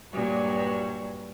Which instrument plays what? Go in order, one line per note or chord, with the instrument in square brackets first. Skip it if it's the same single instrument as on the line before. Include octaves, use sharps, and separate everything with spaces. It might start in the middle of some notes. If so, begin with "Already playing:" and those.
[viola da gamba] G2 A#2 F#3